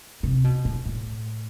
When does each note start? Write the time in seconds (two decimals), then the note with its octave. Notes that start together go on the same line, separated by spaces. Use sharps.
0.23 C3
0.44 B2
0.65 A2
0.85 A2